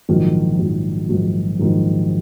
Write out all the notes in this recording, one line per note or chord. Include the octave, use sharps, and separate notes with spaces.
A#1 G#2 D#3 F#3
A#1 G#2 D#3 F#3
A#1 G#2 D#3 F#3
A#1 G#2 D#3 F#3